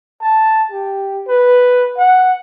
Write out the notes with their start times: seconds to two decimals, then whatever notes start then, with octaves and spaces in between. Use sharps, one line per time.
0.21 A5
0.71 G4
1.28 B4
1.98 F#5